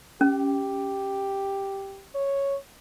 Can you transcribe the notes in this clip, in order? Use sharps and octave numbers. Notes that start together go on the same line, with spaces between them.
C#4 G4
C#5